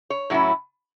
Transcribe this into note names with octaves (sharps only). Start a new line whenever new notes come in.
C#5
A2 F#3 C#4 E4